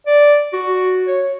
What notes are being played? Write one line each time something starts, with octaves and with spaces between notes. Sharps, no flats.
D5
F#4
C#5